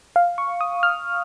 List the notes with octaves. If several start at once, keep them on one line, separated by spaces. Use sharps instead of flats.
F5
C#6
D#6
F6